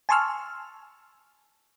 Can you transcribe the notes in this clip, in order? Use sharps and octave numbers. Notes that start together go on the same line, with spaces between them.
G#5 A5 C6 C#6 E6 F6